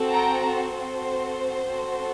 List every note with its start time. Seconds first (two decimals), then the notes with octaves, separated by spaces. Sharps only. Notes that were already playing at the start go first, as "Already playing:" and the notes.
Already playing: C4 F#4 A4
0.12 G5 A#5
0.43 A4 C5
0.75 C4 F#4 A4
1.68 C4 F#4 A4